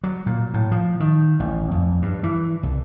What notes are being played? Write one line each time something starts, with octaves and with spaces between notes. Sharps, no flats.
F#3
A#2
A2
F3
D#3
A1
F2
G2
E3
C2